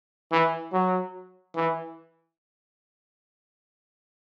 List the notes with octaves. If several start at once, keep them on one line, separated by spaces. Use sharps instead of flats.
E3
F#3
E3